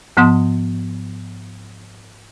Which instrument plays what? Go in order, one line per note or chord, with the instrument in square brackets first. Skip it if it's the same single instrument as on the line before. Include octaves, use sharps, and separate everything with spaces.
[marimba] G#2 F3 B3 F#5 C6 D#6